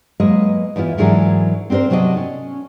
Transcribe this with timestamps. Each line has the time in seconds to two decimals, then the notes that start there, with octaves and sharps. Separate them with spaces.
0.20 F#3 G#3 A#3 B4 D#5
0.76 E2 B3 E4 F4
0.98 G#2 E3 F#3 D4 G#4 A#4
1.70 C4 D4 F#4 A#4 C5
1.90 C3 F#3 D4 F#4 D#5
2.17 C#4